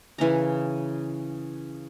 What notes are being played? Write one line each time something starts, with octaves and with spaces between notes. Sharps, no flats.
C#3 E3 C#4 A#5